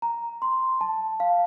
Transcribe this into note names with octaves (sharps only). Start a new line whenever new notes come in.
A#5
C6
A5
F5